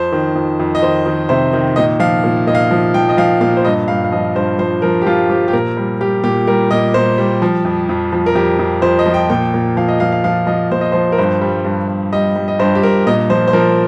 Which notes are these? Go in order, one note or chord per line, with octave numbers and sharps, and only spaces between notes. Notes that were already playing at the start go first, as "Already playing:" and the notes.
Already playing: F2 C5
D#3
F2
F2
D#5
D#3 C5
D#3
C3 C5
D#3
A#2 D#5
F3 F5
A#2
A#2 D#5
F5
D#5
F3
F3 G5
D#5
F3 F5
A#2 F5
C5
G2 D#5
G2 F5
F5
F3 D#5
G2 C5
F3 C5
F3 A#4
G4
F3 F4
F3 G4
G4
A#2 A#4
G3
G3 G4
A#2 G4
G3 A#4
A#2 D#5
A#2 C5
G3
F3
F2
F2
F3
A#4
F2 G4
F2
F2 C5
D#5
F3
G5
A#2 G5
A#2
F3 F5
D#5
F3 F5
F5
F3 F5
F3 D#5
A#2 C5
D#5
F3 C5
A#4
G2 C5
G3
G2
G2
G3 D#5
G3
D#5
G2 C5
G4
G2 A#4
A#2 D#5
F3 C5
C5
F3 A#4